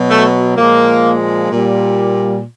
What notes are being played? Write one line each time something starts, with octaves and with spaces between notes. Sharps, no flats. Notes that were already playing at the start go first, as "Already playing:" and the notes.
Already playing: B2 F#3
A3
A#2 F3 G#3 A#3
A#2 G3